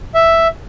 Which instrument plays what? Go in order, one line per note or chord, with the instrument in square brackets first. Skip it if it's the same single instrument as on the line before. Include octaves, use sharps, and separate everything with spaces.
[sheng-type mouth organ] E5